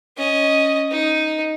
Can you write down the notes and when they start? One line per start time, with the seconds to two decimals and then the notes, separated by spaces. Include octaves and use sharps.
0.17 C#4 D#5
0.90 D#4